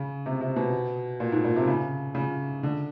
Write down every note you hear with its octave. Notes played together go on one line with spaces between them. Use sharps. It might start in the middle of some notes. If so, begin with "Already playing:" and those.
Already playing: C#3
C3
C3
B2
A#2
G#2
A#2
C3
C#3
C#3
D3